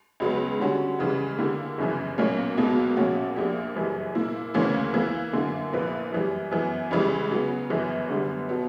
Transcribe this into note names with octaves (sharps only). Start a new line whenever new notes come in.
C#2 C#3 F#3 B3
D3 G3 C#4 F#4
C#2 C#3 E3 G3
D3 A#3 E4 G4
G1 F#2 C#3 E3
B1 A#2 F#3 A#3 C#4
C#2 B2 F#3 A#3
A#1 A#2 A#3 C#4 F#4
A#1 A#2 A#3 D4 G4
F#1 F#2 E3 G3
A#2 A#3 E4
D2 C#3 E3 A#3 C#4
E3 A#3 E4
F#2 D3 A#3
A#1 A#2 A#3 E4 B4
F#2 E3 G3
F#2 E3 B3
C#2 C#3 E3 G3
C#3 F#3 B3
G1 F#2 E3 B3
G1 F#2 D3 G3 B3
B2 F#3 B3